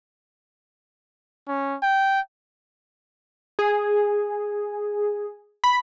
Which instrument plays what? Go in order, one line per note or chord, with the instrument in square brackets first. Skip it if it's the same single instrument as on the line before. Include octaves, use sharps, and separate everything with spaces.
[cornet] C#4
G5
[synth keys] G#4
B5